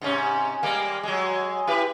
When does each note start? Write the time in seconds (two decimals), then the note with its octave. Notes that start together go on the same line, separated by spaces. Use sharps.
0.01 G#2 C3 C#4
0.63 G3 G#3 A#3
1.03 F#3 G#3
1.67 E4 G4 B4